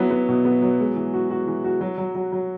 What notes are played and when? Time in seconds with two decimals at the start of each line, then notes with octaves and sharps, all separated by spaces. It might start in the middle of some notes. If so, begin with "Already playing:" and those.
Already playing: F#3 B3 E4
0.11 B3
0.29 B2
0.45 B3
0.62 F#3
0.80 G#3
0.96 E3
1.14 F#4
1.30 F#4
1.47 E3
1.64 F#4
1.81 F#3
1.98 F#3
2.15 F#3
2.32 F#3